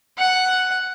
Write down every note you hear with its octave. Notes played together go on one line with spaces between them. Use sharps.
F#5